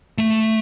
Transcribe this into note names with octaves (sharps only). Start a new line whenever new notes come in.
A3